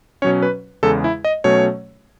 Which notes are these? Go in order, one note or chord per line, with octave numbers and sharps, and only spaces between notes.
B2 F#3 C#4 C#5
B4
E2 C#3 G#3 A4
E4
D#5
B2 F#3 A3 C#4 C#5